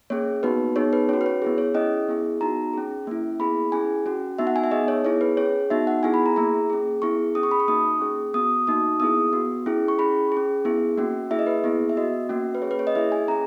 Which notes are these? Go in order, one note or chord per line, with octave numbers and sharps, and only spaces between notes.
A#3 C#4 G#4 C#5
B3 D#4 F#4 B4
B3 D#4 G#4 C#5
B4
C#4 F#4 C#5
B4
C#5
B3 E4 G#4
C#5
C#4 E4 G#4 D#5
B3 E4 G#4
B3 D#4 F#4 A#5
C#4 G#4
A#3 C#4 E4
B3 E4 G#4 B5
C#4 E4 G#4 G#5
C#4 F#4
B3 D#4 F#4 E5
F#5
G#5
E5
B3 D#4 G#4 D#5
C#5
B3 E4 G#4 C#5
B4
C#4 G#4 C#5
B3 D#4 F#4 E5
F#5
B3 E4 G#4 G#5
B5
A#5
A#3 E4 G#4 A#5
C#4 G#4
B3 E4 G#4 C#6
C#4 G#4 D#6
C#6
B5
C#6
A#3 D#4 F#4 D#6
C#4 G#4
B3 F#4 D#6
A#3 D#4 F#4 D#6
B3 E4 G#4 D#6
B3 F#4
C#4 E4 G#4
C#6
C#4 E4 G#4 B5
C#4 G#4
B3 E4 G#4
A#3 C#4 F#4
A#3 E4 G#4 E5
D#5
B4
B3 E4 G#4
E5
B3 F#4 D#5
A#3 C#4 F#4
B4
C#4 G#4 C#5
B4
C#5
D#5
A#3 E4 G#4 E5
G#5
C#4 G#4 A#5